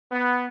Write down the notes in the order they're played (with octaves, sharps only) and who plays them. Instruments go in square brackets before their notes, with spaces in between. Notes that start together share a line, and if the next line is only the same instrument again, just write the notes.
[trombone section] B3